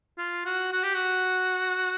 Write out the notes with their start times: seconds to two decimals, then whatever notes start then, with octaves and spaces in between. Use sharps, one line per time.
0.18 F4
0.45 F#4
0.72 F#4
0.83 G4
0.94 F#4